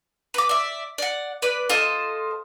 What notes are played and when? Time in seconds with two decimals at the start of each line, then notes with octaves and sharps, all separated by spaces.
0.34 B4 D6
0.49 D5 E5
0.98 D5 F#5
1.42 B4 D5
1.70 F4 A4 C5 D#5